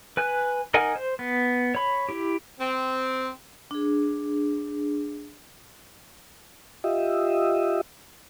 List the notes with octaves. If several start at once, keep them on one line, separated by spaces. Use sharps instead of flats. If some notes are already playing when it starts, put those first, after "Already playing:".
B4 G#5 F#6
D#4 A#4 D#5 F#5 G#5
C5
B3
C#5 B5
E4 G4
C4
D4 G#4
F4 G4 D#5 E5